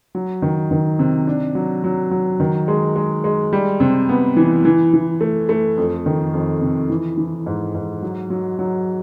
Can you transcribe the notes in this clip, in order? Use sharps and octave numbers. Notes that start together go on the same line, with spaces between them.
F#3
D#3
D#3
C3
D4
F#3
F#3
F#3
D#3
G#3
G#3
G#3
G3
C3
B3
E3
E3
E3
A3
A3
F2
D#3
F2
C3
E3
E3
G#2
G#2
F#3
F#3
F#3